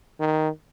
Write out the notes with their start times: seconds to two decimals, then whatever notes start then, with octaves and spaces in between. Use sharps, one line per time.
0.20 D#3